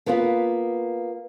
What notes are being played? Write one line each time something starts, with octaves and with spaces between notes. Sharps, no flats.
A#3 B3 F4 F#4 B4